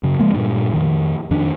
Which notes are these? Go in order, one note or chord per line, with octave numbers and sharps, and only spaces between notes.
F#2 C#3
F3 G#3 A#3
G2 A#2
F2 D#3
F2 D#3 D4